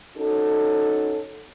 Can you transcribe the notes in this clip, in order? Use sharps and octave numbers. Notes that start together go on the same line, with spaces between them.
C#4 D#4 F#4 A4